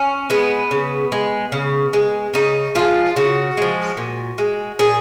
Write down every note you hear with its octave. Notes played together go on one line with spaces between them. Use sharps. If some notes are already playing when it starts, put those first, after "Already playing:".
Already playing: C#4
G#3 B3
C#3
G#3
C#3
G#3
C#3 D#4
F3 G#3 F4
C#3 F#4
F3 G#3
A#2
G#3
A#2 G#4